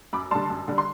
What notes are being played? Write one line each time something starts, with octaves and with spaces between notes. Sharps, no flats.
F#2 B5 D6
D3 G3 A5 C6
F#2
D3 G3
C6